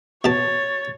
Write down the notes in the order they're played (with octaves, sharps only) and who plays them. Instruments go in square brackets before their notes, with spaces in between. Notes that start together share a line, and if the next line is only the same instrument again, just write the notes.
[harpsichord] B2 A5 [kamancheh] C#5 [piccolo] A6